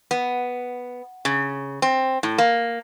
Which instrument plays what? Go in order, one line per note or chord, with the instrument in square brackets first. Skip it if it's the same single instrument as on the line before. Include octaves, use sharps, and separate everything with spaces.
[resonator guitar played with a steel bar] B3
C#3
C4
A2
A#3